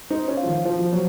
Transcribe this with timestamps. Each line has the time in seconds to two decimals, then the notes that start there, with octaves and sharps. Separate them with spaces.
0.10 D#4 C5
0.28 C#4
0.37 F5
0.43 F3
0.47 D#3
0.65 F3 C5
0.79 F3
0.92 F#3 C5